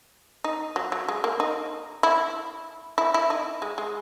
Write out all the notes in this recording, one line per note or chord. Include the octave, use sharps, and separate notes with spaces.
D#4
F#3
F#3
G#3
A#3
D#4
E4
E4
E4
D#4
G#3
G#3